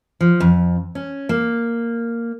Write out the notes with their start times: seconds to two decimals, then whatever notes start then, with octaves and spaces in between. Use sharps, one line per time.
0.21 F3
0.40 F2
0.95 C#4
1.29 A#3